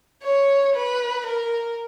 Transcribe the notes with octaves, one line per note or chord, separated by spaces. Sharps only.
C#5
B4
A#4